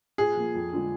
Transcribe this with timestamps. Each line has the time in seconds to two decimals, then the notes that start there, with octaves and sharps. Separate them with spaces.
0.18 A#2 G#4
0.36 F3 A#3
0.55 F2
0.73 D3 F3 G#3 D4